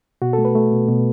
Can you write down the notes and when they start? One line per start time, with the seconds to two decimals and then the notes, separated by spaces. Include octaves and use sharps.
0.22 B2 F#4
0.33 A4
0.38 A3
0.45 B4
0.55 A3
0.72 B2
0.88 B2